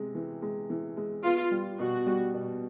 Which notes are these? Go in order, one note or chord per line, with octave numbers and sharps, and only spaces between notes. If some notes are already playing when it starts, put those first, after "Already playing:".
Already playing: C3 G#3
E3
G#3
E3
G#3
B3 F4
G3
B2 F#4
G3
B2